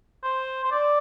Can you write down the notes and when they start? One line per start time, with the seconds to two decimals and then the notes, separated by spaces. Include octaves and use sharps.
0.23 C5
0.64 C5
0.71 D5